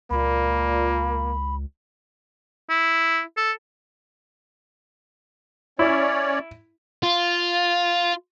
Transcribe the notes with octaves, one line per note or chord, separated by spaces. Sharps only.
C#2 A#2 A#3 B5
E4
A4
C#4 E4 C#5 D5
F4